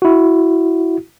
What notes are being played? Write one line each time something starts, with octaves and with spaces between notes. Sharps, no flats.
E4 F#4